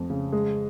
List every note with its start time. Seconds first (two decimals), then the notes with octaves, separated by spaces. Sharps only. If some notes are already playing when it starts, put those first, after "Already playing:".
Already playing: F2
0.10 C#3
0.32 G#3